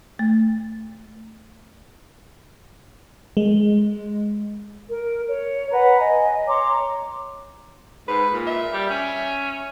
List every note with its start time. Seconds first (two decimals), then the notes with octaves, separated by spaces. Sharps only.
0.19 A3
3.37 G#3
4.89 A#4
5.28 C#5
5.71 B4 F#5 A#5
6.00 D#5 G#5
6.47 C#5 A#5 C6 D6
8.08 G#2 B4
8.30 A#2
8.47 E5
8.73 G3
8.91 C#4